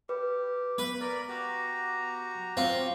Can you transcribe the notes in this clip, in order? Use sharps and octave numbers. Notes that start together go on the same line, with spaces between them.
G4 B4
B3 B4
A#4 D5 B5
F#4 G4 A#5
C4 F4 C5